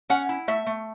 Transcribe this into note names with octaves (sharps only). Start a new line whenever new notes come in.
C#4 F#5
E4
A3 E5
A3